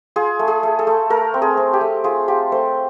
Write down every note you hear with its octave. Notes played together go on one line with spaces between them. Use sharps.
F4 G#4
A3
G#4
A3
A4
A3
A3 A#4
C4
G#4
C4
G4
A3
F4 G#4
F4 G4
A3 C5